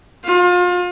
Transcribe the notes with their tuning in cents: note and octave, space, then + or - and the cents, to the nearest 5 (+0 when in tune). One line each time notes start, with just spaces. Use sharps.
F4 +35